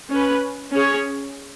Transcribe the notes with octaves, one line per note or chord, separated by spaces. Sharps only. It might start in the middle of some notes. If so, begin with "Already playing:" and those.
C#4 B4
C#4 G#4 C#5